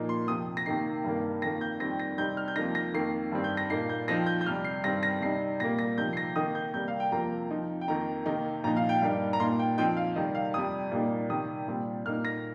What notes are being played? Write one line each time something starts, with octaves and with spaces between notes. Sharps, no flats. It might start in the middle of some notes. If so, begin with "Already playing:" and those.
Already playing: A#2 F3 A#3 D#4
C6
F2 C3 F3 D#6
A#6
C3 D#3 A#3 D#4 C7
G2 D#3 A#3
F2 D#3 A#3 A#6
G6
F2 D#3 G3 C4 A#6
A#6
C3 G3 C4 D#4 G6
F6
G6
F2 F3 A#3 D#4 A#6
A#6
F2 D#3 A#3 C7
G2 D#3 G3 C4
G6
A#6
A#2 A#3 D#4 C7
G6
F2 F3 C4 D#4 A#6
G6
G6
F2 C3 G3 F6
C7
G2 D#3 G3 C4 A#6
A#6
C3 G3 D#4 C7
A#2 G3 A#3 A#6
A#6
C3 F3 D#4 G6
C7
A#6
D#3 A#3 D#4 D#6
G6
C3 G3 A#3 G6
F5
G5
F2 C3 F3 A#3 A#5
F2 F3 D#4
G5
F2 D#3 A#3 D#4 A#5
C3 D#3 A#3 D#4
A#2 F3 D#4 A#5
F5
G5
G2 G3 A#3 D#4
A#5
A#2 A#3 D#4 C6
G5
F2 F3 C4 D#4 G5
F5
C3 D#3 G3 D#5
F5
F2 C3 G3 D#6
A#2 G3 A#3 D#4
C3 D#3 G3 D#6
A#2 G3 C4
A#2 A#3 D#4 F6
A#6